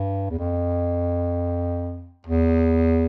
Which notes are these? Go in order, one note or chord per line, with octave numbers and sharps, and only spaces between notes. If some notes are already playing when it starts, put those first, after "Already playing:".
Already playing: G2
E2
F2
E2